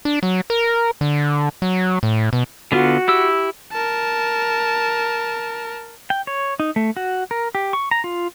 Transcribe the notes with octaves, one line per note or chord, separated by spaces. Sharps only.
D4
F#3
A#4
D3
F#3
A2
B2
D3 B3 F4 F#4
E4 G4 E6
A#4 A5
G5
C#5
D#4
A3
F#4
A#4
G4
C#6
A#5
F4